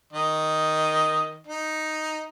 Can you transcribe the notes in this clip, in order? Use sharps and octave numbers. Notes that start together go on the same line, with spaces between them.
D#3 D#5
D#4